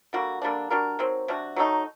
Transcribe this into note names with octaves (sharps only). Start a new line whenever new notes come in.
D3 G3 A#3 F#4
D3 G3 A#3 D4
G3 D4 F#4 A#4
D#3 F#3 C4
C3 G3 D4 F#4
F#3 A3 C4 D#4